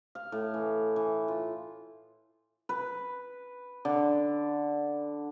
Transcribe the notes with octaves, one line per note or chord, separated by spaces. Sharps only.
F5
A2
E3
E3
F4
B4
D3